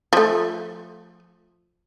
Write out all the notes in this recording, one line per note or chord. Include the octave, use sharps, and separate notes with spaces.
F3 A3